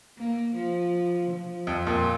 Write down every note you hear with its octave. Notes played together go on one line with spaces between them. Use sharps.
A#3
F3
F3
F2
F2 A#2